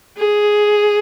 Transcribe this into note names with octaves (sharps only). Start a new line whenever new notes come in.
G#4